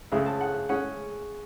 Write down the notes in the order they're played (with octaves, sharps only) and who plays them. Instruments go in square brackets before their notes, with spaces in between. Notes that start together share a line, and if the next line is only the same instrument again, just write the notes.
[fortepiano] C#2 C#3 G#3 C#4 E5
A5
F#5
G#3 C#4 F#5